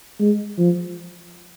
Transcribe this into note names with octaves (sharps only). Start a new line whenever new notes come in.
G#3
F3